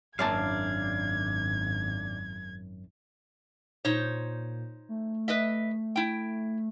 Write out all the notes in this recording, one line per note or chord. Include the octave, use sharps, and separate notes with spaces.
G#1 F#2 A#3 D4 D5 F5 A5 G#6
A#2 D#4 C5 C#5
A3
B4 D#5 E5
E4 G5